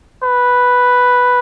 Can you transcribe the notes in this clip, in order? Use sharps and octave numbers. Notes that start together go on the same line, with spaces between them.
B4